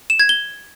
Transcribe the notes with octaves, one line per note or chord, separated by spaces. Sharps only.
E7
G#6
G7